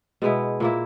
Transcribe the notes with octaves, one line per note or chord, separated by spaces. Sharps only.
B2 G#3 B3 E4
A#2 A#3 E4